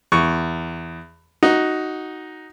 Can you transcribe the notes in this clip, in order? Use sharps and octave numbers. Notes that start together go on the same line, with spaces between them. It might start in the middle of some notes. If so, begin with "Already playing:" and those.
E2 C#6
D#4 F#4